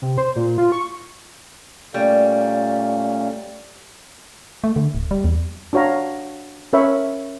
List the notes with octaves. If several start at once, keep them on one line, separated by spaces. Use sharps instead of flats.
C3
C5
A#2
F4
C#6
A#2 G3 A3 A#3 C#4
A3
D3
D1
G3
E2
D4 F#4 C#5 F5 A#5
C#4 A#4 C#5 E5 B5 C#6